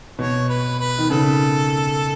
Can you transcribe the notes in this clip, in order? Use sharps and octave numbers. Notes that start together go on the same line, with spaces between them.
B2 C#5
B4
B4
D#3
C#3 A4